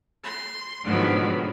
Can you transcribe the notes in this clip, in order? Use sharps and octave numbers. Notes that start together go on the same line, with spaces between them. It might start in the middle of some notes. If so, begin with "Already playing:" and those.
C6
G#2 B2 D3 D#3 F3 F#3